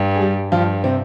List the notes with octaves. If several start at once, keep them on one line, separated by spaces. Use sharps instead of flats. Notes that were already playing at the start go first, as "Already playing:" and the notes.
Already playing: G2
G#4
G3 G4
G2 F3 F4
C3 C4